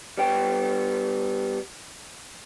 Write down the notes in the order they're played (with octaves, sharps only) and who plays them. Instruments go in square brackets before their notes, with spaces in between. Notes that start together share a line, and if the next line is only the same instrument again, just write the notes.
[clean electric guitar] G3 B3 G5